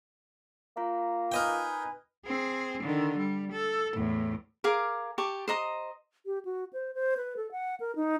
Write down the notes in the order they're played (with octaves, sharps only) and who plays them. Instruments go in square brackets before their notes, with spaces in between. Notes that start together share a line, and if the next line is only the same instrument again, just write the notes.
[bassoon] A#3 [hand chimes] F4 F5 A#5
[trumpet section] D#4 B4 G#5 [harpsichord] A#4 D#5 G5
[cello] C4 G#4
D3 D#3
G3
A4
E2 A2
[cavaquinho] G#4 A#4 F5 D6
G4 A5 C#6
C5 D#5 A#5 D#6
[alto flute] G4
F#4
C5
C5
B4
A4
F#5
A#4
D#4